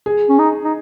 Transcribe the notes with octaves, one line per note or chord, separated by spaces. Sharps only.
G#4
C#4
D#4
D#4